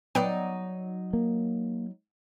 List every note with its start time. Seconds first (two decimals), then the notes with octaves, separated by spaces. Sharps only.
0.15 F#3 B3 D#4 D5 G5
1.13 A#3